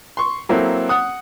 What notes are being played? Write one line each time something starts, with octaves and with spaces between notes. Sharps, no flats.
C6 C#6
F#3 A#3 C4 E4 A4
F#5 D#6